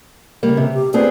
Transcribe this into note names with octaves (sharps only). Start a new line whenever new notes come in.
C#3 G3 A#3
C3
G4
B3 C4 G#4 D5